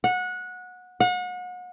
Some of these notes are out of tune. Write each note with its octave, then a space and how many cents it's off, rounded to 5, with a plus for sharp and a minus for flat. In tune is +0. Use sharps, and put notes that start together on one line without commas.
F#5 -20
F#5 -35